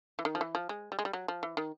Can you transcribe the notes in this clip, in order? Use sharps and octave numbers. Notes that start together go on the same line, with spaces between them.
E3
D#3
F3
E3
F3
G#3
G3
G#3
G3
F#3
F3
E3
D#3